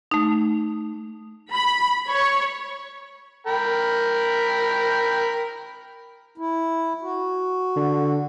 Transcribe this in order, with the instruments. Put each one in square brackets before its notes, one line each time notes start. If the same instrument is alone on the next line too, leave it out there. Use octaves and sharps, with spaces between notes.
[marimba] A3 D#4
[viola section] B5
C#5
[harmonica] A#4 G5 B5
[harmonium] E4
F#4
[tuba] D3